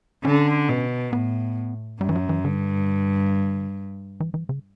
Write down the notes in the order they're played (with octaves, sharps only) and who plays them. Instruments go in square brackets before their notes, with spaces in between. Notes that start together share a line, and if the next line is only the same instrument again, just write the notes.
[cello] D3 [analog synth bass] C#4
[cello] B2
[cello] A2 [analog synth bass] B3
[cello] F#2 [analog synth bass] G3
[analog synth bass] E3
F#3
E3
[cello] G2 [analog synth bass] D3
[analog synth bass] E3
E3
C#3